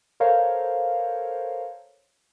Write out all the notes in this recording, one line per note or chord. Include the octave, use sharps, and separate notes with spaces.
A4 A#4 C5 C#5 F5